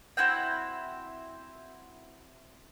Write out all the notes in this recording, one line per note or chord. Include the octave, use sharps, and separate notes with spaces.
C4 E4 F#4 G5